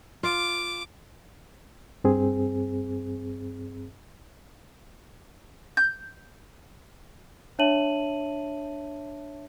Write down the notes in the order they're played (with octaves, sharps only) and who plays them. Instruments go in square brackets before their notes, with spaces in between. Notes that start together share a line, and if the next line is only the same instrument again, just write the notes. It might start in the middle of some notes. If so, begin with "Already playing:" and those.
[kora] F4 [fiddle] D6
[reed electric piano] G2 C4 G#4
[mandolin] G6
[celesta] D4 C#5 E5 A5 D#7 F#7